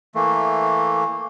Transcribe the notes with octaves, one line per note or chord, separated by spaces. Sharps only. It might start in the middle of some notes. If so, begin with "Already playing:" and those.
E3 A3 A#3